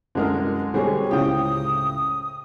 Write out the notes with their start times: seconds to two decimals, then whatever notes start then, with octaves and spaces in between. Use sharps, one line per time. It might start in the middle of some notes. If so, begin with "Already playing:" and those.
0.15 C2 F#2 D3 G#3 A#4
0.74 B2 D3 G3 C4 F#4 G#4 C#5
1.11 C#2 A2 C#3 G4 G5 D#6